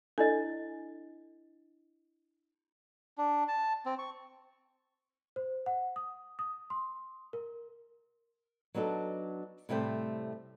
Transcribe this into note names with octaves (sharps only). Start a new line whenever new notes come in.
D4 E4 A4 D#5
D4
A5
C4
C#6
C5
F#5
D#6
D#6
C6
A#4
F#3 B3 D4 D#4 A4
A2 C3 G3 A3 C5